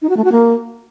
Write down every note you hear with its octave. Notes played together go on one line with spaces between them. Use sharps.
D#4
F#4
A3
F#4
A#3